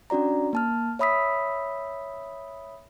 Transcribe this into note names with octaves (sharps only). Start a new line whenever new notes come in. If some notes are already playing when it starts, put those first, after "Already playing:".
C#4 D4 F#4 D5 A#5
A#3 A5 F6
C#5 E5 B5 D#6 E6 B6